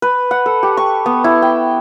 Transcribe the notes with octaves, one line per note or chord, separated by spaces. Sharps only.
B4
F#5
A4
G4
C#6
B3
E4
G5